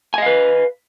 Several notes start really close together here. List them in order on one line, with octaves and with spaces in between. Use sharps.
G#5 D#5 F5 B4